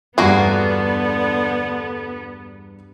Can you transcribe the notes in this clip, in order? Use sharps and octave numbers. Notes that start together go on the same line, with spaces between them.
E2 G2 D3 A#3 B3 F#4 G#4